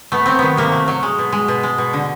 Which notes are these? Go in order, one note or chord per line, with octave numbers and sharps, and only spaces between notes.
A3 B3
F#3 C4
D#3 B3
C3 A#3
A3
F#3
G#3
B2
G#3
B2
G#3
B2
D3